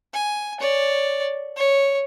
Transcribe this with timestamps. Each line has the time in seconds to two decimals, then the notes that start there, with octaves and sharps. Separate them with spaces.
0.14 G#5
0.60 C#5 D5
1.57 C#5